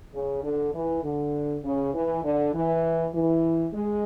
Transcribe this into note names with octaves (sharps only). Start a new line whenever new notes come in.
C#3
D3
E3
D3
C#3
E3
D3
E3
E3
G#3